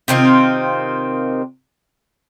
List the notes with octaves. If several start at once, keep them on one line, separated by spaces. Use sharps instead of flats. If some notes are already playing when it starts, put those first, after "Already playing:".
C3 D#3 C4 F4